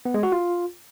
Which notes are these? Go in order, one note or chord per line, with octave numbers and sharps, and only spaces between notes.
B3
G#3
F#4
F4